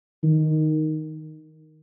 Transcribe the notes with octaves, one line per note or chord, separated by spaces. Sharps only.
D#3